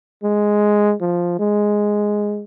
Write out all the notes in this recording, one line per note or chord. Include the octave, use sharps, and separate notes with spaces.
G#3
F3
G#3